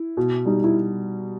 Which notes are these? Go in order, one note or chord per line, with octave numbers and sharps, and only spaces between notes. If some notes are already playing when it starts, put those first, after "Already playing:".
Already playing: E4
B2
G3 D#4
E4